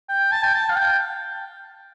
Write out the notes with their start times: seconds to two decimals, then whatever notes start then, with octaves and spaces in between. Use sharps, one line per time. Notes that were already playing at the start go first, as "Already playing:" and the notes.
0.09 G5
0.32 A5
0.43 G5
0.54 A5
0.69 F5
0.76 G5